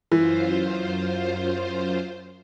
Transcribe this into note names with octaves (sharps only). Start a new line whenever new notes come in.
F#2 E3 F4 C5